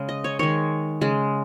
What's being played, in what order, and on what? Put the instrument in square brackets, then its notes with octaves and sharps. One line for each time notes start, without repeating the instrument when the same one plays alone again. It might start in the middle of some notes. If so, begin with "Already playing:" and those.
Already playing: [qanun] C#3 G#3
D#5
C#5
D#3 G#3 C#5
C#3 G#3